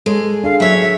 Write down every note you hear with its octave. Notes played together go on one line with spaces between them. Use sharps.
G#3 G#4 A4 C#5
D4 G#4 A4 F5
F#3 C#5 E5
G#4 E5